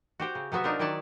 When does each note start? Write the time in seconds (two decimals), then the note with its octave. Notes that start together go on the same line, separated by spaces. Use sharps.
0.20 F#4 G4 C5 G5
0.35 C#3
0.52 C3 F#3 B3 F#4 E5
0.64 D4 D#4 F4 F#4 A#4 C5
0.79 D#3 F#3 E4 D5 F#5 A5